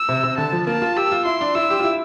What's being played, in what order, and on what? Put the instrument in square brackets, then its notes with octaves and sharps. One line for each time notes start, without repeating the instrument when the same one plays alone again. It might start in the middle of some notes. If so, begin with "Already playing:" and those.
Already playing: [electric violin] E6
[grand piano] C3
C3
[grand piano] D3 [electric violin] A5
[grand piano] F3
[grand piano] A#3 [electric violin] A5
[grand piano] F4
[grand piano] G4 [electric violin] E6
[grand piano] F4
[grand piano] E4 [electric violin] C6
[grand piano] D4
[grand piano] E4 [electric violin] E6
[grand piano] G4
F4
E4